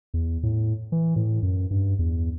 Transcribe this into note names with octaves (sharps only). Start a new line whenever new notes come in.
E2
A2
E3
A2
F#2
G2
E2